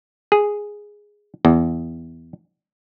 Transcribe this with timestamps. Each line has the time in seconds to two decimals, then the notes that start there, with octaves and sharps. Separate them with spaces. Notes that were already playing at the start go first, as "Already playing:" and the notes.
0.32 G#4
1.45 E2